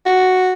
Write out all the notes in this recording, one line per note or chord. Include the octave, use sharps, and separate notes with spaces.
F#4